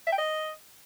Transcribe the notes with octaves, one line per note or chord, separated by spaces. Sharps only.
E5
G5
D#5